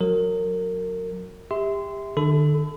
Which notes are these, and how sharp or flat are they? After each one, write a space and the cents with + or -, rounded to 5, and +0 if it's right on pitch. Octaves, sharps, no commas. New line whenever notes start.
F#3 -15 A#4 -25
G4 +30 E5 -20 C6 -20
D3 +40 A4 -10 B5 +35